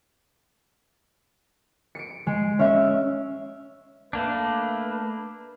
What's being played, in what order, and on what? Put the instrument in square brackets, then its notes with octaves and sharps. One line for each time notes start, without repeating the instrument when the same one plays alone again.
[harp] C#7 D7
G#3
C#4 E5
[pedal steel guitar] A3 A#3 D4 [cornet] B4